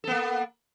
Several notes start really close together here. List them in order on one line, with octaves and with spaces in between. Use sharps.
A4 B3 A#3